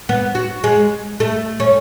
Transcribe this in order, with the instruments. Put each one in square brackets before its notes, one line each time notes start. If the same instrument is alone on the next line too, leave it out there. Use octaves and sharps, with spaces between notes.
[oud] B3
F#4
G#3
A3
C#4